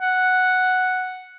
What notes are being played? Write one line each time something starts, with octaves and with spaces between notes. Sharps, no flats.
F#5